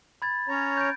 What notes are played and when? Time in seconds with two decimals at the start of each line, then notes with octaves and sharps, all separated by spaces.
0.22 B5 G#6 A6
0.49 C#4 C#5 A#5
0.77 G6 G#6 D7